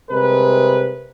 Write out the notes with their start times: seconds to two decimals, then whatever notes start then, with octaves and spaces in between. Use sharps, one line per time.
0.10 C3 G3 G#3 A#4 B4